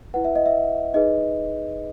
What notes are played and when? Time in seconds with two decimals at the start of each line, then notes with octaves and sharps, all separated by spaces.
0.14 E4 B4 F#5
0.25 E5
0.35 D#5
0.46 E5
0.94 D#4 G#4 B4 D#5